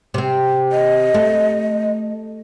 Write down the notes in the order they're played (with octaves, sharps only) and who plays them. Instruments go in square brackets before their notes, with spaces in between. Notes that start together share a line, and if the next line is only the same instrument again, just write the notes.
[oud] C3 C4
[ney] D#5
[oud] A3